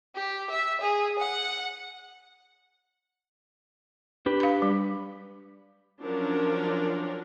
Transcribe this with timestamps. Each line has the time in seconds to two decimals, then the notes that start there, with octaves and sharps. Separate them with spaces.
0.15 G4
0.49 E5
0.81 G#4
1.19 F#5
4.26 D4 G4 B4
4.40 F5 B5
4.62 G3
6.01 F3 F#3 C#4 D4 A#4